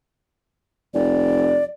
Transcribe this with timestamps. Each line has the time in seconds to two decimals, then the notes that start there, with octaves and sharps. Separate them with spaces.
0.94 F1 D5